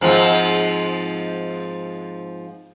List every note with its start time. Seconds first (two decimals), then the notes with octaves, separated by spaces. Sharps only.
0.01 G#2 F3 C4